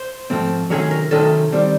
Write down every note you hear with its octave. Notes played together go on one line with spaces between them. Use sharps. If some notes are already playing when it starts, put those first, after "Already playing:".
Already playing: C5
G#2 F3 A3 C4
C3 D#3 F#3 A3 C#4 G#4
A#4
C3 D#3 F#3 A3 C#4 A4
D#3 G3 C4